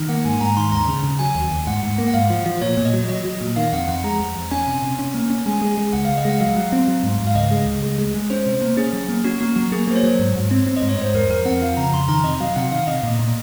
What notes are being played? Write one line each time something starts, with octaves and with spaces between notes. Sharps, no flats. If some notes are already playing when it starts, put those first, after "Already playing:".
Already playing: D#3
A#3 F#5
G#2 G#5
G#2 A#5
D#3 C6
D#2 A#5
C#3
C#3
F#3 G#5
D#2
D#2
G#2 F#5
G#2
A#3
F#5
G#2 F5
F3
F3
A#2 C#5
A#2
D#5
F#3
F#3 D#5
F#3
A#2
D#3 F5
F2 F#5
F2 F#5
G#3 A#5
F2
F2
C#4 G#5
C3
C3
C#4
A#3
C#4
G#3 G#5
G#3
G#3
C#2 F#5
C#2 F5
D#5
G#3 F#5
F#3 F5
F#3
C4
F#3
G#2
G#2
F5
C#2 D#5
G#3
C#2
G#3
G#3
G#3
C#4 C5
C3
A#3
C#4 G#4
F#3
A#3
C#4 F#4
A#3 F#4
F#3 F#4
A#3 G#4
A#3 C5
C#5
F#3
G#2
G#2
C4
C4
D#5
G#2
C#5
G#2 C5
F2 A#4
F2 A#4
C4 F#5
F3 F5
C#3 A#5
F2 C6
D#3 A#5
C3 D#5
F#3 F5
C3 F#5
D#3 F5
C3 D#5
A#2
A#2